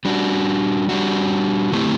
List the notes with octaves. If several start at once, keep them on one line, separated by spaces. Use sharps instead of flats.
G3 D4 F#4
G3 D4 F#4
D3 A3 C4 E4 G4